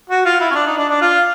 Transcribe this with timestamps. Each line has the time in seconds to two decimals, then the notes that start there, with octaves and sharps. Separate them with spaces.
0.10 F#4
0.25 F4
0.40 E4
0.51 C#4
0.55 D4
0.67 D#4
0.77 D4
0.90 D4
1.01 F4